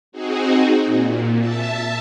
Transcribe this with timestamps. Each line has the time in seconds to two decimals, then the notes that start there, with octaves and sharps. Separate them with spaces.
0.12 C4 D#4 F#4 G#4
0.86 A#2
1.38 E5 A5